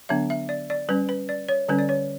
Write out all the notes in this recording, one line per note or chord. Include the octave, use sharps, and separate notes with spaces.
D3 F#3 B3 D4 E5
E5
D5
D5
G3 C#4 B4
B4
D5
C#5
D3 G3 C#4 B4
D5
C#5